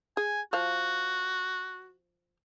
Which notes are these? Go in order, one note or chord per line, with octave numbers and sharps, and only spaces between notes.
G#4 G#5
F3 F#4 F5